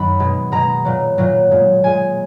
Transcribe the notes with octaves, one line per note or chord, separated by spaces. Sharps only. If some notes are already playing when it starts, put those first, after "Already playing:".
Already playing: F#2 D#3 F#3 B5
B2 G#3
B2 G#3 A#5
A#2 F#3
A#2 F#3
A#2 G#3
A#2 G#3 G#5